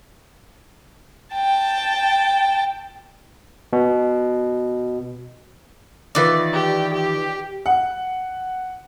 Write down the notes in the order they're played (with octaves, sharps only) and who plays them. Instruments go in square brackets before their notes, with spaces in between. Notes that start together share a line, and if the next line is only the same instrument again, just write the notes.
[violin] G5 A5
[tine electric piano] B2
[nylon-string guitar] D#3 F4 B4 [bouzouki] E3 D5
[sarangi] G4
G4
[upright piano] F#5